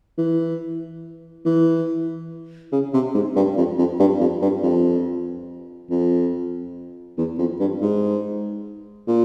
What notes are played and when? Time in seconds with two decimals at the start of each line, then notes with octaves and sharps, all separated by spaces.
0.17 E3
1.45 E3
2.72 C#3
2.93 C3
3.14 G#2
3.36 G2
3.57 F2
3.78 F2
3.99 G2
4.20 F2
4.42 G2
4.63 F2
5.90 F2
7.18 E2
7.38 F2
7.59 G2
7.81 G#2
9.07 A#2